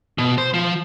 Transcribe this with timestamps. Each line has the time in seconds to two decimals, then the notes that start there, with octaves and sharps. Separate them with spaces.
0.18 B2
0.38 C5
0.54 F3